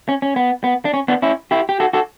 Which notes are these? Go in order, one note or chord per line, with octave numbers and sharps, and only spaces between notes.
C#4
C#4
B3
B3
D4
C#4
B3 D4
C#4 E4
E4 G4
G4
F#4 A4
F#4 A4